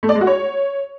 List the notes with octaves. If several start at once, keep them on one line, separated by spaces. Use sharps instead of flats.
A3
D5
G#3
F#4
C#5